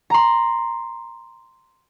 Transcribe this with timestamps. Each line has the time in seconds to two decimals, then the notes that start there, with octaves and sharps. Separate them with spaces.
0.10 A#5 C6